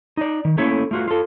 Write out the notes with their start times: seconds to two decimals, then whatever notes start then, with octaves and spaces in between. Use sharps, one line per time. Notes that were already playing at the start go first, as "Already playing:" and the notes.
0.17 D#4 D5
0.45 D#3
0.58 A3 A#3 C#4 E4 A4 C#5
0.91 A3 F4 F#4
1.08 F4 A4